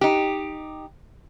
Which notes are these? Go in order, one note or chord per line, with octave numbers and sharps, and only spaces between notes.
D#4 G4